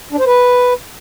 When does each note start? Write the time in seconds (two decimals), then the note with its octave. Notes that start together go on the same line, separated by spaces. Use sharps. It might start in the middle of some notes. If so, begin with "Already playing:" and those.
0.12 D4
0.19 C5
0.26 B4